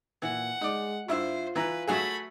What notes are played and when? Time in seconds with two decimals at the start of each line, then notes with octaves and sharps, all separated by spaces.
0.22 A#2 E3 F#5
0.61 G#3 D#4 D5
1.08 G2 E4 F4 C5 E5
1.56 E3 B4 A#5
1.87 F#3 A3 F#4 G#4 B5